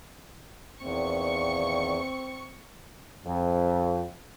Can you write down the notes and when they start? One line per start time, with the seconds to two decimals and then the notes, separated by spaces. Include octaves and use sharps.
0.82 E2 A#2 D#3 A#3 C4 C#6
3.25 F2